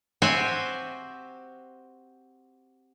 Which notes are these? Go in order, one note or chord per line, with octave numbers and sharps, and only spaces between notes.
C4 F#4 G4 C5 E5 G#5